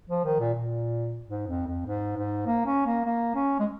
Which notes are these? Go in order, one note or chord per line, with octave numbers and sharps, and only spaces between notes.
F3
D#3
A#2
A#2
G#2
F2
F2
G#2
G#2
A#3
C#4
A#3
A#3
C#4
G#3